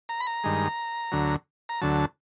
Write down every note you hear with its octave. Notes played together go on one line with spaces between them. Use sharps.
A#5
B5
A#5
G2 D#3 G#3
D2 D3 F#3
A#5
D2 D3 F#3 A5